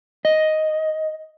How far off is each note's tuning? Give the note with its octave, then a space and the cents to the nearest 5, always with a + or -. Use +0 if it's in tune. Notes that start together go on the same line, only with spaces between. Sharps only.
D#5 +5